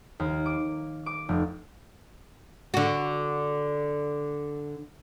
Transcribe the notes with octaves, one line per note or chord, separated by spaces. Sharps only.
D#2
D6
D6
F1
D3 F#4